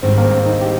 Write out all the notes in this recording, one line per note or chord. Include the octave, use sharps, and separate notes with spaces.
G#2 D#3 G3 C4
A#3
C4
D#4
G4